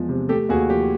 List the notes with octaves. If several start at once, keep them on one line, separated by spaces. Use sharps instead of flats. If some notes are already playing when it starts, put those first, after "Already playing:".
Already playing: E2 F3 G#3
C3
A3 G4 A4
D#2 F#4 G#4
F3 G4